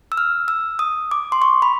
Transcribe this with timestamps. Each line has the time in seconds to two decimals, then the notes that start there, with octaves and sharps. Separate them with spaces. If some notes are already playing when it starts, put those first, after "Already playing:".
0.12 E6
0.17 F6
0.48 E6
0.79 D#6
1.11 D6
1.32 C6
1.42 C#6
1.62 B5